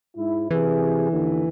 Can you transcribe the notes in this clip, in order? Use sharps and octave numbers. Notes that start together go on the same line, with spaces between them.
G#2 E4
C3 E3 G#4
D#2 D3